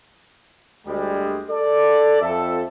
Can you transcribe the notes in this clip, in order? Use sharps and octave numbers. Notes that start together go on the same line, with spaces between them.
D2 G3 G#3
A4 D5
F2 A4 E5